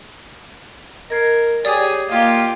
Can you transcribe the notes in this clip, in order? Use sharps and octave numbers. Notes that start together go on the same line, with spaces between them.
A#4 D#5 G#6 C7
G4 G#4 C#5 D5 D#6 A6
A#3 F4 G4 D#5 G#6